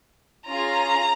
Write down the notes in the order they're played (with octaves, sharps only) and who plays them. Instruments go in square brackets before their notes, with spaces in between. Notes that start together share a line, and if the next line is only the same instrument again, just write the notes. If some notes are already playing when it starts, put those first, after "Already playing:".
[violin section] C#4 F4 G#4 A#5